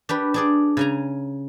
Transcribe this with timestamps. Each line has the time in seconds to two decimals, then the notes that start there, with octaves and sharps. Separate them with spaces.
0.09 D4 G4 B4
0.34 D4 G#4 D5
0.77 C#3 G#5 A#5